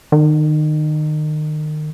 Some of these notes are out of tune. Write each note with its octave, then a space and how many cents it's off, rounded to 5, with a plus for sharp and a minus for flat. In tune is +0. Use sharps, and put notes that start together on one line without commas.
D#3 -30